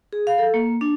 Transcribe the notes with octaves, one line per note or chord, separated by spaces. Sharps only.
G#4
F5
A4
A#3
D4